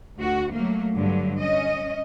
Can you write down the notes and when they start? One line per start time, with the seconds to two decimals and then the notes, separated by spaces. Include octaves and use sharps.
0.18 D2 F#4
0.52 F#3 A3 A#3
0.95 G2 D3 F#3
1.41 C#4 D#5